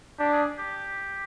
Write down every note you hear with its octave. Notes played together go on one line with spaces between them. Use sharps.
D4 G4
G#4
G4